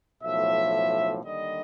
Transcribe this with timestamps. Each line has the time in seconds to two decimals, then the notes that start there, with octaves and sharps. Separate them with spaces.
0.23 B1 A2 F3 E5
1.24 D#2 D3 G3 D#5